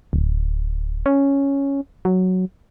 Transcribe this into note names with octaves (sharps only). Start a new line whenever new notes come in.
D1
C#4
F#3